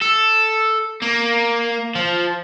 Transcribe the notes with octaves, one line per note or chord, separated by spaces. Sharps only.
A4
A#3
F3